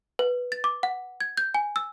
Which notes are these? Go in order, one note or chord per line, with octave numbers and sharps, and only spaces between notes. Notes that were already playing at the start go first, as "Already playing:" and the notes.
B4
A6
D6
F#5
G#6
G6
G#5
E6